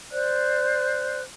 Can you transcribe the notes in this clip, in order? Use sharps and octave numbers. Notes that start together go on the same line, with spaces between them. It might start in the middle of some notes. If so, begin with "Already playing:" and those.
C5 D5 F#6